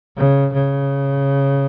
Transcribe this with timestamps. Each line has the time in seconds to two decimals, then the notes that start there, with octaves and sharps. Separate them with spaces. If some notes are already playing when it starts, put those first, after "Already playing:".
0.17 C#3
0.53 C#3